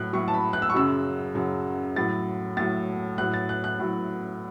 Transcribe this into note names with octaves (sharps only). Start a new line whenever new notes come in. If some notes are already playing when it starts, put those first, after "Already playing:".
Already playing: A2 F#3 F#6
A2 F#3 C#6
A5
B5
F#6
E6
C#6
F#2 C#3 F#3 E6
F#2 C#3 F#3
A2 F#3 A6
A2 F#3 A6
A2 F#3 F#6
A6
F#6
F#6
A2 F#3